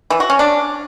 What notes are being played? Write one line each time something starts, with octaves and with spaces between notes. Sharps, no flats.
E3
F#4
C#4
D4